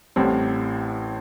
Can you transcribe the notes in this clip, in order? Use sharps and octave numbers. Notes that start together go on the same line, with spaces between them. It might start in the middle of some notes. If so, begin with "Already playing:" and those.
A1 A2 G3 C4